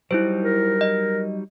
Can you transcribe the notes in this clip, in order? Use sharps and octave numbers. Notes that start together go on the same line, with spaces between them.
F#3 G3 D#4 E4 C5
A#4
D#5